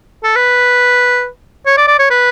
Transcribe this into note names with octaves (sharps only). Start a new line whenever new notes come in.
A4
B4
C#5
D5
D5
C#5
B4